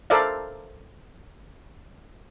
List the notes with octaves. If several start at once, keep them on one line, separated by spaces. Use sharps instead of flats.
A4 A#4 C5 D5 E5 F5